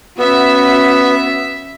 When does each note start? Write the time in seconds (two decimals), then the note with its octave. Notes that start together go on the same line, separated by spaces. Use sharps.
0.18 B3 C#4 F#4 E5